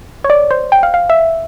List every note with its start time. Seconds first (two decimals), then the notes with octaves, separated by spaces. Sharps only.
0.24 C#5
0.30 D5
0.51 C5
0.72 G5
0.83 F5
0.94 F5
1.10 E5